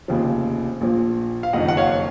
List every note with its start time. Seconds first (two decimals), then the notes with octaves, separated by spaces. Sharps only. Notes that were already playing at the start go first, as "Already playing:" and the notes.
0.08 F1 D#2 C#3 F3
0.81 A#1 A#2 F3
1.43 F5
1.53 F#1 F2 D#3 D#5 F#5
1.68 F#5
1.77 C#5 F5